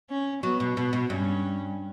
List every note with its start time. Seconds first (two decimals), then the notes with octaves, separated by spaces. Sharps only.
0.10 C#4
0.43 F#3 B3
0.60 B2
0.77 B2 B3
0.93 B2
1.10 G2 C#4